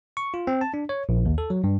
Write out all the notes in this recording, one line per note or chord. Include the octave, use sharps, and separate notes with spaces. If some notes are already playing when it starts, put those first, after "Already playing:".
C#6
F4
C4
A5
D4
C#5
A#1
D#2
A4
F#3
G2